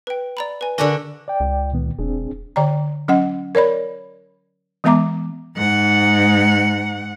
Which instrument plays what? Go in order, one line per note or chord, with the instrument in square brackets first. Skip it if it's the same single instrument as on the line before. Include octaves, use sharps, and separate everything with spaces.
[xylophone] B4 G5
D5 A#5 B5
B4 G#5
[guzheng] D3 D4 F#4 [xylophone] A#4 G#5
[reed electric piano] D5 G5
[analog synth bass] C#2
[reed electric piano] A#2 D#3 B3
[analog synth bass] E1 [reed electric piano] C4 D4 G#4
[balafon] D3 D5 G5 A#5
F#3 C#4 D#5 F#5
A#4 C#5 D5 B5
E3 G#3 B3 E5 A#5 D6
[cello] G#2 F#5